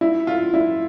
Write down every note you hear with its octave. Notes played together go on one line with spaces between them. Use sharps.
E4
F4
E4